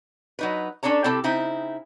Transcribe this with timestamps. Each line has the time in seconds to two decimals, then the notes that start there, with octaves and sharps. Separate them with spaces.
0.39 F#3 D#4 B4
0.83 C#4 D4 A4 C#5 A#5
1.04 C3 C4 E4 G4 A4
1.24 C#3 C4 D#4 E4